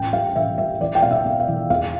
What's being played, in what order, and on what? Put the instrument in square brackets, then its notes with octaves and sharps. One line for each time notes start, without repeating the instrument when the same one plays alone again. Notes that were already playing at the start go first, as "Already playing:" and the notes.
Already playing: [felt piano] A1 G5
G3 F5
A1 E5
G3 E5
E3 D5
G5
B1 F5
E5
B1
F5
E3
E2 F5